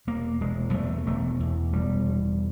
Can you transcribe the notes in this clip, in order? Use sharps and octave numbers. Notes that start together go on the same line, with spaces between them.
E1 A#3
E1 G#3
E2 A3
E1 A3
E2
E1 G3
E2